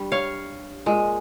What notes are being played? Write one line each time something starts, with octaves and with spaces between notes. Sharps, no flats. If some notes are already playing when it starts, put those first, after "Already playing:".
Already playing: G2 G3
C#5 F5
A#2 G#3